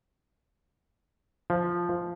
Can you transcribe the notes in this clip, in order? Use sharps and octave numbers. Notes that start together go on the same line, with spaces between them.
F3